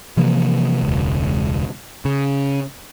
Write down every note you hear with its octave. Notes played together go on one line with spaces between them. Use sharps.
C3 E3 F3 A#3
E1 C#2
C#3